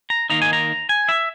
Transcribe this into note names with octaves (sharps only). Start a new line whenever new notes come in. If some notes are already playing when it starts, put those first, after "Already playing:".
A#5
D#3 A#3 D#4 A#5
G#5
A#5
G#5
E5